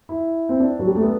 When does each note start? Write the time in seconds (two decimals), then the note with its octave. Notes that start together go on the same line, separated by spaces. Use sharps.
0.09 E4
0.49 C4
0.60 D4
0.79 F#3
0.87 G3
0.95 A3
1.02 B3